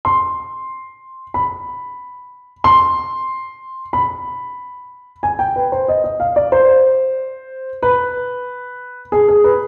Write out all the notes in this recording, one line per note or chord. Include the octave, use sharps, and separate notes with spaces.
C6
B5
C6
B5
G#5
G5
B4
C5
D#5
D#5
F5
D5
C5
B4
G#4
G#4
B4